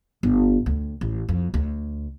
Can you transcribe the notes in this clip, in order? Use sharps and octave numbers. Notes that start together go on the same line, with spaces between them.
G1
D2
A1
F2
D2